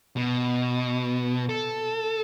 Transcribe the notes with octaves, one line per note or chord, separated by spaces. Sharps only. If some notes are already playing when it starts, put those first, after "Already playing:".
B2
A4